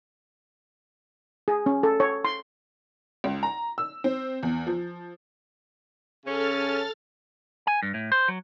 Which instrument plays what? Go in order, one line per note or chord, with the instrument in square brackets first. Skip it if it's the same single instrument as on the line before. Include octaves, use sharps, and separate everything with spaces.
[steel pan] G#4
C#4
A4
C#5
C6
[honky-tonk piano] C#2
A#5
E6
C4
E2
F3
[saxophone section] C#3 C#4 [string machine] A4 F6 A6
[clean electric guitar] G#5
G2
A2
C5
F#3